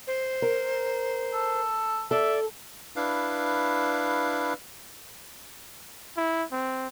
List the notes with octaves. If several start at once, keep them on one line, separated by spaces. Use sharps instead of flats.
C5
A#4
A4
A4 D5 E5
D4 E4 B4 F5
E4
C4